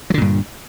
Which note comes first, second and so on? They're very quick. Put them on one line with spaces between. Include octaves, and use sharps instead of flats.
F#3 D3 A#2 G2